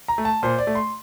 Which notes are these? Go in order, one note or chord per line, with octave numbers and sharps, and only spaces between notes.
A#5
A3
A5
A#2 C5
D5
A3
C6